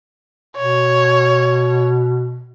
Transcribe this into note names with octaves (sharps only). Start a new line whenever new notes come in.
B2 C#5